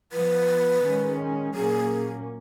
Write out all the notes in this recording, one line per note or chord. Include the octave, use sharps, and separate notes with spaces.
F3 B3 B4
D#3 G#3 C#4
A#2 F#3 A#3 C#4 G#4